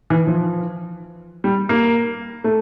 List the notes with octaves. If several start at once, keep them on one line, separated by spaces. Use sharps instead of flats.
E3
F3
G3
A#3
A3